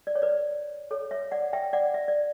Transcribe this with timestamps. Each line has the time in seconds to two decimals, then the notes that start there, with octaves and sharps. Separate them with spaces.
0.07 D5
0.15 C#5
0.22 B4 D5
0.91 A4 C#5
1.11 C#5 E5
1.31 D5 F#5
1.53 E5 G5
1.73 D5 F#5
1.94 E5
2.08 D5